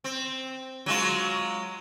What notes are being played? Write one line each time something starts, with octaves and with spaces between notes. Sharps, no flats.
C4
F#3 G#3 F4